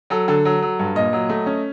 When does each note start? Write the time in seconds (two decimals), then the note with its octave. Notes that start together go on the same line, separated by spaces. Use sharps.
0.10 F#3 A4
0.28 D3 A4
0.45 F#3
0.62 F#3
0.79 G2
0.95 A#2 D#5
1.13 F#3
1.29 A3
1.46 C#4